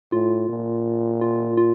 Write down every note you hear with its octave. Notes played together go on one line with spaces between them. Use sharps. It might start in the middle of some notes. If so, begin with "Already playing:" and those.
A2 F4
A#2
F4
F4